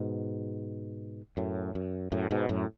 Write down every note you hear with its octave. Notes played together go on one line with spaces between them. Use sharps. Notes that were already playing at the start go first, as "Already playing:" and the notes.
Already playing: G#2 B2
F#2 A2
F#2
F#2 A2
G#2 B2
F#2 A2